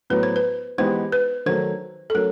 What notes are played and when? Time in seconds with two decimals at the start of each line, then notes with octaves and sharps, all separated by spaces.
0.10 A2 F#3 B3 B4
0.23 C5
0.36 B4
0.78 E3 G#3 B3 D#4 G4 C5
1.12 B4
1.46 D#3 F#3 A3 C5
2.10 A4
2.14 F#3 A3 C#4 A#4